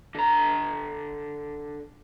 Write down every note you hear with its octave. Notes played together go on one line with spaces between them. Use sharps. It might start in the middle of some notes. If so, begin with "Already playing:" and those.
D3 A#5